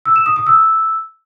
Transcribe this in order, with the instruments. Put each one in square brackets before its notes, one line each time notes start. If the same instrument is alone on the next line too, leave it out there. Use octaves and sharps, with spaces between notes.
[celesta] E6
E7
D#6
D#6
E6